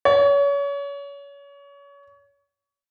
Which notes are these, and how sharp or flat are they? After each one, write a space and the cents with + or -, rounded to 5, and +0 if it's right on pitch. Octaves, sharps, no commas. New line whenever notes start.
C#5 +30